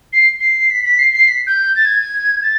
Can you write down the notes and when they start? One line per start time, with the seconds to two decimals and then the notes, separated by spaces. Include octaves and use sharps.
0.12 C7
0.40 C7
0.70 B6
0.84 B6
0.98 C7
1.13 C7
1.28 B6
1.47 G6
1.75 A6
1.85 G#6
2.43 A6